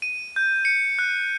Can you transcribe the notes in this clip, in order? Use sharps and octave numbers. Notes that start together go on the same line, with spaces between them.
D#7
G6
C#7
F#6